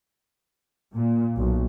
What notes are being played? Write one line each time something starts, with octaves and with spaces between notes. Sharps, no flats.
A#2
B1